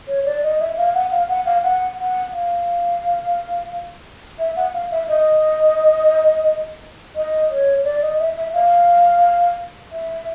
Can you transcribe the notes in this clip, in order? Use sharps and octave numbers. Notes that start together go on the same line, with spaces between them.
C#5
D5
D#5
E5
F5
F#5
F5
F#5
F5
F#5
F#5
F5
E5
F#5
F5
E5
D#5
D#5
C#5
D5
D#5
E5
E5
F5
E5